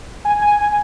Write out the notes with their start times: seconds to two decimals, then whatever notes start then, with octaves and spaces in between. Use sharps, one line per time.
0.25 G#5
0.41 G#5
0.59 G#5